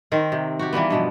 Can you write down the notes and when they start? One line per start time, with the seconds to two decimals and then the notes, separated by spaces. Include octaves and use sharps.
0.12 D#3 C4 A#4
0.32 C3
0.59 F#4 G4
0.73 E3 G3 A#3 B3
0.90 G2 B2 F3